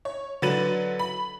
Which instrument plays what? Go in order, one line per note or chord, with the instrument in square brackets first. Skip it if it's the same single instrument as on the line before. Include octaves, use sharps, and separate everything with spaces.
[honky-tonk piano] C#5
D3 F#3 B4 A6 D#7 F#7
B5